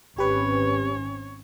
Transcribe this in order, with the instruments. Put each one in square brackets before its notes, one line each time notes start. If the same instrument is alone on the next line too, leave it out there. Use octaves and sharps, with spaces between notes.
[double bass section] G#1 C4 C#4 [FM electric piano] G4 B4 [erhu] C#5